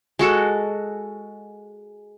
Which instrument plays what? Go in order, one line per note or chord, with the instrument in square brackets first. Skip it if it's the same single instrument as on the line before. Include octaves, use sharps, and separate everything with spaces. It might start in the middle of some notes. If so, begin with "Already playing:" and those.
[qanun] G#3 F#4 A4